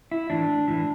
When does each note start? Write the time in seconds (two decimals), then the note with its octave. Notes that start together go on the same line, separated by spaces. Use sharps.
0.11 E4
0.30 A2 E3 D4
0.68 A2 E3